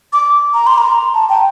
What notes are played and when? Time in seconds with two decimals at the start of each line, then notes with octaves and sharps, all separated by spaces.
0.13 D6
0.54 A#5
0.67 C6
0.78 A#5
1.15 A5
1.29 G5